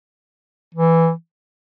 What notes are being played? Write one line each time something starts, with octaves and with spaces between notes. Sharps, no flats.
E3